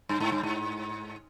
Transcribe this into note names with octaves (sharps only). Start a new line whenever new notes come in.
G2
G#2
G2
G#2